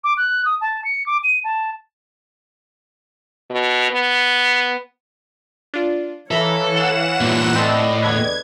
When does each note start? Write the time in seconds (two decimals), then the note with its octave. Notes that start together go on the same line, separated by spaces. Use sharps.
0.04 D6
0.17 F#6
0.45 D#6
0.61 A5
0.84 C#7
1.06 D6
1.24 D#7
1.44 A5
3.50 B2
3.91 B3
5.74 D4 F4
6.31 E3 A4 C#5 E5 F5 A#5 B5
6.72 E3 F#5 E7
7.21 G2 A#2
7.55 A2 C4 A4 D5 D#5
8.02 E2 D3 B4 G#6